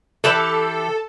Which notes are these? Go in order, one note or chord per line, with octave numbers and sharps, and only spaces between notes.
E3 G4 A4 A5